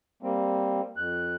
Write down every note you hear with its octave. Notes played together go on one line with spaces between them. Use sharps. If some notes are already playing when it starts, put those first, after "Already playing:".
G3 A#3 C4
F2 F#6